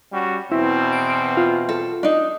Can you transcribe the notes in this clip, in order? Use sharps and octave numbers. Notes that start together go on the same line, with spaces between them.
G3 C#4 F#4
E2 B2 C4 E4
D7
F4
A4
D4 D#4